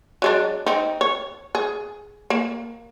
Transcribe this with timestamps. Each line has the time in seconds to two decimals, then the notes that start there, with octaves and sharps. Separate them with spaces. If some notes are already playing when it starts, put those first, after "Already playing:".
0.22 F#3 G#3 D4
0.66 C4 D#4
1.01 C#5
1.55 G#4
2.30 A#3